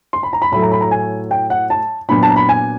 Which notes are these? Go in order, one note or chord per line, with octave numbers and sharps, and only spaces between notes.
C6
B5
A#5
B5
A2 F#3 A3 B5
A#5
B5
A#5
G#5
G5
F#5
A5
A#2 F#3 B3 D4 B5
A5
A#5
B5
G#5